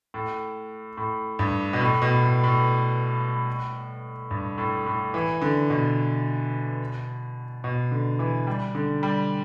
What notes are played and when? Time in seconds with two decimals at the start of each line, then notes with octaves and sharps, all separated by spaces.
0.14 A2
0.97 A2
1.39 G2
1.73 B2
1.80 A2
2.02 B2
2.22 A2
2.44 A2
4.31 G2
4.58 A2
4.86 A2
5.14 E3
5.42 D3
5.70 B2
7.64 B2
7.91 D3
8.19 E3
8.47 G3
8.75 D3
9.03 G3